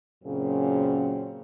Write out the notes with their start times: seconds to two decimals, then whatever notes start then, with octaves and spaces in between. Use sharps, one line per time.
0.24 F#2 A#2 C#3 C4